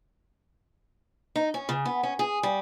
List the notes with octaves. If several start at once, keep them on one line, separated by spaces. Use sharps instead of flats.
D#4
C#4
C#3
B3
C#4
G#4
G3